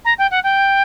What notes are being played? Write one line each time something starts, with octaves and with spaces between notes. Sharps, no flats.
A#5
G5
F#5
G5